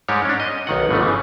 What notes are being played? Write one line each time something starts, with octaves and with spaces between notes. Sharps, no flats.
G#2 G3 G#3 G4 C#5
C#4 D4
D#5
B1 D#3 F#5
G1 B2 F3 A3
C#3 E3